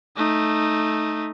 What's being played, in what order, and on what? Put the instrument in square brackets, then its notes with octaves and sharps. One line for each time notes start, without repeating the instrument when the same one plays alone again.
[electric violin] A3 D#4